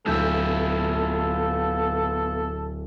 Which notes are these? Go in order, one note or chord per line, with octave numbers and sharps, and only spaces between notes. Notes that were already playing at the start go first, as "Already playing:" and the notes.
D1 B3 F4 A4 E5 G6